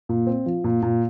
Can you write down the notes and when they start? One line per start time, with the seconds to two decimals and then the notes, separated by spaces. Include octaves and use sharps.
0.09 A#2
0.27 C4
0.46 F3
0.64 A#2
0.82 A#2